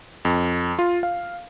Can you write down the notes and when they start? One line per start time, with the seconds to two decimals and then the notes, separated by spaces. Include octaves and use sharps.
0.25 F2
0.79 F4
1.03 F5